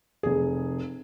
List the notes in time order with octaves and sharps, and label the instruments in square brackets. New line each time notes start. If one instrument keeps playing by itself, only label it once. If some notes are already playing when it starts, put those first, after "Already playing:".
[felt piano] F1 G#4